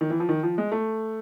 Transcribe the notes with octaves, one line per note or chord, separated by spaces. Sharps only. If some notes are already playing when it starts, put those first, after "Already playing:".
D#3
E3
F3
D#3
F3
G#3
A3